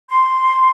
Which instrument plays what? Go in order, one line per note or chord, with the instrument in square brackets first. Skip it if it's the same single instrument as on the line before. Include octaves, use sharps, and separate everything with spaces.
[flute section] C6